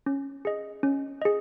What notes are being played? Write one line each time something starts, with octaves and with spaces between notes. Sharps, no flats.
C#4
G#4 D#5
C#4
G#4 D#5